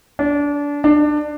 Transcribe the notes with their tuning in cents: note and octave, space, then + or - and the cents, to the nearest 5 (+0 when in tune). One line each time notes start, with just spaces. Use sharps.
D4 -25
D4 +20